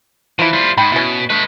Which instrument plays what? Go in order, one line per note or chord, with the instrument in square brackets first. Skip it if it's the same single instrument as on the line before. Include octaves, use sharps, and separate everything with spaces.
[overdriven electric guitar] E3 [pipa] F3 E4
[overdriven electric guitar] G3 F4
[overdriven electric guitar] G#2 [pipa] G5 B5
[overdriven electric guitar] B2 [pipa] C#4 E4
[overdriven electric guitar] G#3 B4 [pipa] A3